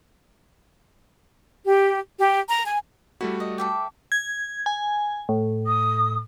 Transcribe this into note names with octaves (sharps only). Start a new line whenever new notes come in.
G4
G4
A#5
G#5
G3 A3 E4 F#4
D#5
A4 E5 G5 D6
G#6
G#5
A2
D#6